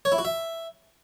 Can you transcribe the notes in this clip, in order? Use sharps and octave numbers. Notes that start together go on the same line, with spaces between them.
C#5
E4
F#4
E5